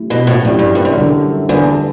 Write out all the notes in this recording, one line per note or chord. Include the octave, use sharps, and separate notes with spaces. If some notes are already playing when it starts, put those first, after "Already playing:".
Already playing: F#3 A3 C#4 E4 G4
B2
A2
G2 F#3 A3 C#4 E4 G4
G2
G2
F#2
D3 G3 D4 A4
E2 D3 G3 D4 A4